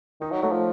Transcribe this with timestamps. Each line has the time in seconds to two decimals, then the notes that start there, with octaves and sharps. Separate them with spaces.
0.21 D#3 D#4
0.31 F#3
0.42 F#3 A3
0.52 F3